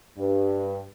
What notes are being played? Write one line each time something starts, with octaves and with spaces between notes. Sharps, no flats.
G2